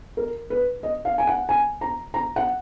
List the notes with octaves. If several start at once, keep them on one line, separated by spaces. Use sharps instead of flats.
A#4
B4
D#5
F5
G#5
F#5
G#5
A#5
A#5
F#5